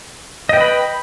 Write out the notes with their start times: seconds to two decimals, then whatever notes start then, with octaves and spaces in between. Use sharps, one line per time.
0.49 D#5
0.53 G5
0.57 B4
0.61 B5